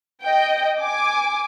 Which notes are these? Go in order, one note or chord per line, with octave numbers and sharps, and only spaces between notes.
D#5 G5
G#5 D6